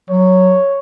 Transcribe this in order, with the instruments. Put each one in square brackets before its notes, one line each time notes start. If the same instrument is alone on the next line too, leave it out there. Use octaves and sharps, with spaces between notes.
[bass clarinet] F#3 [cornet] C#5